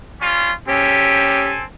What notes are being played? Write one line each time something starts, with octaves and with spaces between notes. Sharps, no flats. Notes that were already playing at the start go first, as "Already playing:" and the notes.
G3 C#4 F4
C4 C#4 G4 A4 G#5